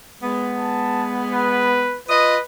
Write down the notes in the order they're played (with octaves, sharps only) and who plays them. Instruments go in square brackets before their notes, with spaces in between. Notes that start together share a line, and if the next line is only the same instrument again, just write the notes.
[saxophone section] G#3 B3
[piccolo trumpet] A5
B4
[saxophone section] F4 D#5 [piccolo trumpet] B4